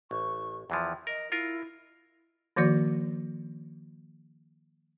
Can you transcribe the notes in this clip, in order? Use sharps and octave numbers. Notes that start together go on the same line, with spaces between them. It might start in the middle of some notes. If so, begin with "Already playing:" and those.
A1 C#6
E2 E3 F3 G5
A#4 D#5
E4 F4 A#4
D#3 F3 A#3 F#4 D5